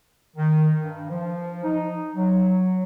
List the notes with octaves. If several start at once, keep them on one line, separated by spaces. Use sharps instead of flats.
D#3
G2
F3
D#4
F#3